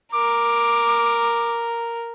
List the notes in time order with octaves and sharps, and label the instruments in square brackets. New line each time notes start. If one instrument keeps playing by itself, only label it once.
[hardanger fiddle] A#4 [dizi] D6